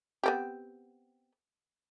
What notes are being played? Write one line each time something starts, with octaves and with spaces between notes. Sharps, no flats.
B3 C4 G4